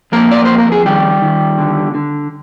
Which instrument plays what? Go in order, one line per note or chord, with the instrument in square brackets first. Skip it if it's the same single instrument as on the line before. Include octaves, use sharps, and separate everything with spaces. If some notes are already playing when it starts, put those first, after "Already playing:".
[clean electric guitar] F2 A#3 A#4
D5
F2 C5
A#4
G#4
D#3 G3 G4
D#3
D3
D3